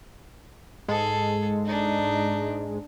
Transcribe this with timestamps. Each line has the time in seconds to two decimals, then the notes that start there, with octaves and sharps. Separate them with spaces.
0.89 G#2 G#3 G#4 A4
1.65 D4 D#4